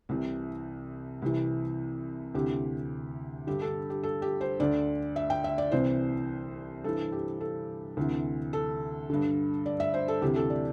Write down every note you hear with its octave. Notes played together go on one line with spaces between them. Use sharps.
C2 C3 E3
C2 C3 E3
D2 C3 E3 G4
G2 D3 G4
A4
G4
A4
G4
C5
D2 D3 D5
E5
G5
E5
D5
C2 C3 E3 C5
G2 E3 A4
G4
A4
D2 C3 E3
A4
G2 D3
D5
E5
C5
A4
D2 C3 E3 G4
A4
D5